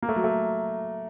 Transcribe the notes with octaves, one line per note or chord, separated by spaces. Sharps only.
A#3
A3
F#3
A3